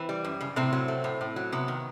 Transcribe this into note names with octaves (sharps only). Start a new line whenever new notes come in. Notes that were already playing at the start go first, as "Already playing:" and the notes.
Already playing: E3 C4
G3
F#2
C#3
A2 C3 C4
F#3
A3
A2
A2
F#3
C3 B3
D#3